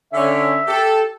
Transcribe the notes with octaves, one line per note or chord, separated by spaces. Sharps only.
D3 C#4 E5
G4 A4